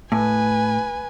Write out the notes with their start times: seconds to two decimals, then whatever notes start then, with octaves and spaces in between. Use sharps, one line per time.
0.12 A2 B4 G#5